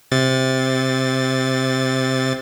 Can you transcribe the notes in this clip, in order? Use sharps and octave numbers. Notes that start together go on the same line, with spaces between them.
C3 A6